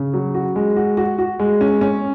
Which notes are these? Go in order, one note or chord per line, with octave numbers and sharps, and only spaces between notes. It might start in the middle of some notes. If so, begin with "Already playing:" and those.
Already playing: C#3
F#3
F#4
G#3
F#4
F#4
F#4
G#3
C#4
C#4